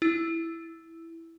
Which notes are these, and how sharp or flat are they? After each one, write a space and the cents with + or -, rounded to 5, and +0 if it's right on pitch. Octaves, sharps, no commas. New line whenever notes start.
E4 +0 E6 +0